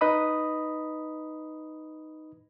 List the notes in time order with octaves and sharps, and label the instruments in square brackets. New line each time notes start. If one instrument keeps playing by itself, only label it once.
[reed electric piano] D#4 B4 D#5 B5 D#6